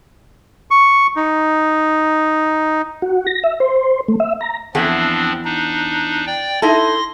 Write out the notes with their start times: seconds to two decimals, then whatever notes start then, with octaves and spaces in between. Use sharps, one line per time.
0.71 C#6
1.16 D#4
3.02 F#4
3.27 A#6
3.44 E5
3.60 C5
4.08 A3
4.20 E5
4.41 A#5
4.75 E2 F3 C4 D4 G#4 F#5
5.45 D4 D#4
6.27 D5 G5
6.62 D#4 E4 A4 C6 A#6